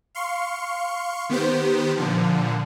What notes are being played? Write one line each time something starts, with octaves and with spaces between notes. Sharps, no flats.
F5 C6 C#6
D#3 B3 G4 C5
A#2 D3 F3